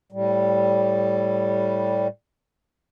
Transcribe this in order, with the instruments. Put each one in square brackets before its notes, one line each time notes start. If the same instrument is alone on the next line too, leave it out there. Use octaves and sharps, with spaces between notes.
[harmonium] A2 G3